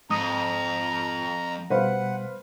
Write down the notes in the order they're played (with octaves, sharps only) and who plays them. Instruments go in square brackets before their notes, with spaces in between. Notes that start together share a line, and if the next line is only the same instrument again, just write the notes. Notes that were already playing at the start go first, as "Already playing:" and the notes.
[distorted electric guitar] F2 [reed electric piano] G#2 D#6 [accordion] A#5
[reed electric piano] B2 G3 [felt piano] B4 C5 F5 [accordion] F#5